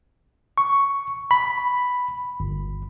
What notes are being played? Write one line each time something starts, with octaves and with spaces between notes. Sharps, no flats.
C#6
B5
G1